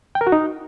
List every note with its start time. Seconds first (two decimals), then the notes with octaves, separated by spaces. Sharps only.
0.15 G5
0.21 A#4
0.27 F#4
0.32 D#4